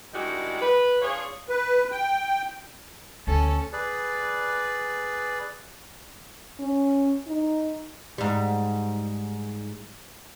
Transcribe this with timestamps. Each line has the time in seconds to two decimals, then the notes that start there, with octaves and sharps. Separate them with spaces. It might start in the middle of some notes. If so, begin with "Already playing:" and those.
0.13 D#3 G3 G#3 D4 E4 F#4
0.60 B4
1.02 D4 F4 G#4 C#5
1.49 B4
1.92 G5
3.27 D2 C#4 A4
3.73 G#4 B4 D5
6.60 C#4
7.27 D#4
8.18 G#2 G3